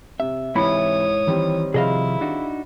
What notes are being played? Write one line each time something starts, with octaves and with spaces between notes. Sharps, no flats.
C3 E5
C2 G#2 E3 E4 C#5 B5 D#6 C#7
D#3 E3 G3 C4
C3 F3 E4 G#4 D#5 F5
D4 D#4 F#4